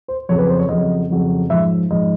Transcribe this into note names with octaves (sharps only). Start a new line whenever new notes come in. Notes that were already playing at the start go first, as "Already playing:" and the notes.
C5
F2 C#3 F#3 C#5
B4
C5
C#5
F2 C#3 F#3 D#5
F2 C#3 F#3
G#2 F3 E5
G#2 F3 D#5